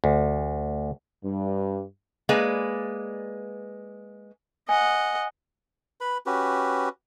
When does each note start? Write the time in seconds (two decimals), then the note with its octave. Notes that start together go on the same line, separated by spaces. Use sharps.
0.04 D2
1.24 G2
2.29 G#3 A#3 B4 D5 G#5
4.69 D#5 F#5 G#5
6.01 B4 B5
6.26 C#4 F#4 G4 B4